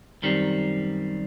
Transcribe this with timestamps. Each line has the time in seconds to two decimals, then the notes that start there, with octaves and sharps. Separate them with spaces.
0.22 F#2 D#3 G3 C4